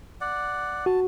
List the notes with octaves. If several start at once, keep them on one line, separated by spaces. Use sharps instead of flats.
D5 F#5
F#4 A5